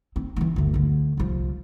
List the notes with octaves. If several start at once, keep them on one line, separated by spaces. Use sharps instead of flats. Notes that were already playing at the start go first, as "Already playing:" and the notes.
C4
E3 C#4
G1 D2
D2 D3
C2 F3